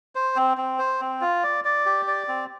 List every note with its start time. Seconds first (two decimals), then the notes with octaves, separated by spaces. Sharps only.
0.15 C5
0.36 C4
0.57 C4
0.79 C5
1.01 C4
1.21 F4
1.43 D5
1.64 D5
1.86 G4
2.08 D5
2.28 C4